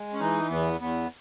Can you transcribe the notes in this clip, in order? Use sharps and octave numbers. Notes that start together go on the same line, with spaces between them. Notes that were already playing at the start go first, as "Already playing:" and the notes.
Already playing: G#3
C#4
E3 D#4
E2 B3
E2 B3